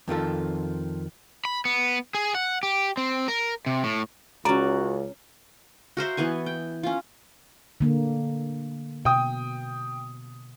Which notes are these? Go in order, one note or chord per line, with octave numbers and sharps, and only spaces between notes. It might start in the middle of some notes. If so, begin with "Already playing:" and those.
F2 D#3 F4 A4
B5
B3
G#4
F#5
G4
C4
A#4
C3
A2
C#2 C#4 F#4 D5 A#5
F#4 A#4 C5 E5
E3 B3 G#5 C#6
G5
C#4 F4
D3 A#3
B2 G5 D#6